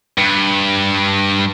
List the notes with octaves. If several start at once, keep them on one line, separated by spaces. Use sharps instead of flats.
G2